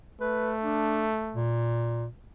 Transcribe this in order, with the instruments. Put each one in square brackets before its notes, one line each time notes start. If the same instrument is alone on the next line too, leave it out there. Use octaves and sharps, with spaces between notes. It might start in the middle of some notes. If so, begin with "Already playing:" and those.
[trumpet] A3 [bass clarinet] B4
[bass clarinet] D4
A#2